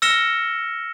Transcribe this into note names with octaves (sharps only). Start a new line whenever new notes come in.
E6 F6 A#6 C#7 E7 G7